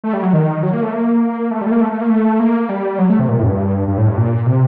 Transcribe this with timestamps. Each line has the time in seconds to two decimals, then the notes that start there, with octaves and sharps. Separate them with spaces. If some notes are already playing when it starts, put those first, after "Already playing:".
0.04 A3
0.13 G3
0.23 F#3
0.33 D#3
0.63 F#3
0.73 A#3
0.83 A3
0.93 A#3
1.51 A3
1.61 G3
1.66 A3
1.71 A#3
1.81 A3
1.91 A3
2.01 A#3
2.10 A3
2.40 A#3
2.69 G3
2.99 F#3
3.10 A3
3.19 C3
3.29 A#2
3.39 A2
3.43 F#2
3.48 G2
3.88 G2
3.98 A2
4.08 G2
4.17 A#2
4.46 C3